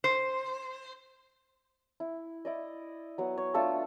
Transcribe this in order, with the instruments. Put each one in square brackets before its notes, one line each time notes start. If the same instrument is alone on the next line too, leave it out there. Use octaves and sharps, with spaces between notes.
[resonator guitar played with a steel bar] C5
[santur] E4
E4 D5 D#5
F#3 B3
C#5
A3 D4 F4 A4